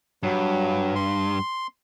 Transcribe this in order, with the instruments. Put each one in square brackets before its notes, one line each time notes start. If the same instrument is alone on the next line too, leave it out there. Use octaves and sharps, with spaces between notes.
[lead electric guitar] G2 [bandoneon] F#3
[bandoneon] C6